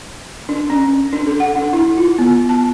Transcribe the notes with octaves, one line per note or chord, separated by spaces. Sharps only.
D4
C#4
D4
A4
F#5
D4
E4
F4
B3
A5